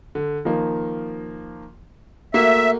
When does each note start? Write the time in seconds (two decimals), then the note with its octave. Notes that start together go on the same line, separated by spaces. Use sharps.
0.15 D3
0.45 D#3 F3 A#3
2.34 A3 A#3 F#4 E5